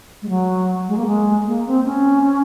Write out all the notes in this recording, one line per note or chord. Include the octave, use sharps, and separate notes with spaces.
G#3
F#3
G#3
A#3
G#3
A#3
C4
C#4